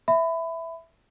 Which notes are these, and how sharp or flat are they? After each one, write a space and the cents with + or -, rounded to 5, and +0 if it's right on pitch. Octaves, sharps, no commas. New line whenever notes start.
E5 +0 B5 +25